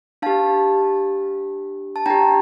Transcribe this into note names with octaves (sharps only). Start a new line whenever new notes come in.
D4 G4 F5 A5
A5
D4 G4 G5 A#5